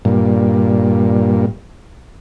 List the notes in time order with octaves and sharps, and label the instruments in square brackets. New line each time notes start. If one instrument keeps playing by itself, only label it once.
[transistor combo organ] G2 A#2